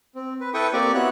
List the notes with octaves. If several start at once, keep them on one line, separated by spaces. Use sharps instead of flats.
C4
B4
E4 A4 B4 G5 C#6 D#6
A#3 C4 G4 D5 C#6 D6
B3 E4 F#4 C#5 F#6